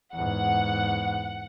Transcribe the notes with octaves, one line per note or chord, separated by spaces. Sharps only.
E2 G#2 F#5